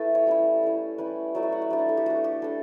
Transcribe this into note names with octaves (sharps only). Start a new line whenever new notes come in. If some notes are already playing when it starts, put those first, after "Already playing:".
Already playing: A3 E4 A4 B4 E5
C#5
G3 C#4 E4
A3 E4
G3 C#4 E4 B4
F#3 A3 E4 D5
E5
F#5
E5
G3 D4 D5
C#5
A4
G4
A3 D4 F#4
G4
G3 D4 A4